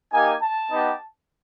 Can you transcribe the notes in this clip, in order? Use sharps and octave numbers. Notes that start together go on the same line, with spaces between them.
A#3 D#4 G4 G#5
A5
B3 D#4 G4